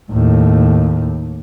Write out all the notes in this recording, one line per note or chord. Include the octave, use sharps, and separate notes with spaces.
D#2 A2